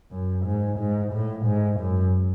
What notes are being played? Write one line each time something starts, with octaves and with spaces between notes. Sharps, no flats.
F#2
G#2
G#2
A2
G#2
F#2